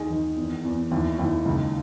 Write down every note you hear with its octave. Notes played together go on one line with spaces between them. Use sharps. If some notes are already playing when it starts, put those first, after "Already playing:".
Already playing: D#2 D#3 G#4
D#3
E2
E2
D#2 E4
D#2 E4
C#2 D#4